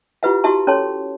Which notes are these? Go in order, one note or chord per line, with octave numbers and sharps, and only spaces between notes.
E4 F4 G4 B4 E5 F#5
E4 F#4 G4 E5 A5 C#6
C#4 A4 C#5 A5 C6